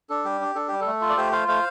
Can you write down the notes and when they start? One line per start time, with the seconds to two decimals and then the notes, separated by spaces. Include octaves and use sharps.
0.09 D4 A4
0.25 G3 G4
0.41 D4
0.55 D4 A4
0.68 G3 G4
0.81 A4
0.87 A3
1.01 F4
1.09 D5
1.17 A3 G4 C5
1.32 F4 C5 F5
1.48 A3 C5 F5